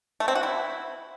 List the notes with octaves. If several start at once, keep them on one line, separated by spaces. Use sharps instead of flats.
A3
C4
F#4
E4